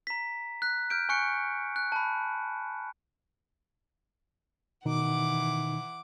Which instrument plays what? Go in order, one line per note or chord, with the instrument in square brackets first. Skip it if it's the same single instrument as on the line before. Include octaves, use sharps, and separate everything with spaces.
[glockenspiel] A#5 B6
F#6 B6
F6 G6 D7
G#5 C#6 F#6 C#7 D7
F#6
A5 B5
[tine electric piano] B2 D#3 D#4 [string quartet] E3 F#5 D6